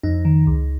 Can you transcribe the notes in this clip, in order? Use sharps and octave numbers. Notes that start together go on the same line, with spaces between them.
F2 D#4
D#3
C#2